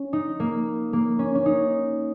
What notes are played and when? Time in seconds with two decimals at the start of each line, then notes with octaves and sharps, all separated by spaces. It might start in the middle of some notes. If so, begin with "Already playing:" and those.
Already playing: C#4
0.13 D#4
0.40 A#3
0.93 A#3
1.19 C#4
1.35 C#4
1.46 D#4